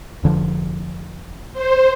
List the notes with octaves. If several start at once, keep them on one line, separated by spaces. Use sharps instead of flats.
F1 D3 F3
C5